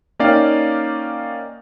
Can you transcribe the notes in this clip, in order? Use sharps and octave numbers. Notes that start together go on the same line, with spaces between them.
A#3 C#4 D#4 D5 F5 G5